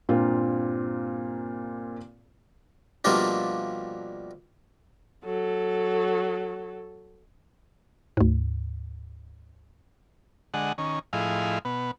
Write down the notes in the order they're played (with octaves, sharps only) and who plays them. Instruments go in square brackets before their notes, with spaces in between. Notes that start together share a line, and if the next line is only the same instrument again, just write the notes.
[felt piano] G2 A#2 A#3 C4 F4
[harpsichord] B2 F3 G3 A3 A#3 D4
[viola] F#3 A4
[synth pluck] D2 G#2
[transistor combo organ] D3 G#3 D#5 F#5
D#3 C#4
A2 F3 E4 G#4 D#5 F5
B2 B3